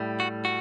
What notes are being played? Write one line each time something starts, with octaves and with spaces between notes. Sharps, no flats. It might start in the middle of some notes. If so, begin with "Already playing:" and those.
Already playing: A2 G3
F#4
F#4